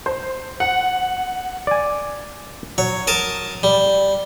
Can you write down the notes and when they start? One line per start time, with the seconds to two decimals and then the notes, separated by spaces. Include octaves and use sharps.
0.06 C5
0.60 F#5
1.67 D5 G#5
2.78 F#3 C#5
3.07 A#4 A5 D#6
3.63 G3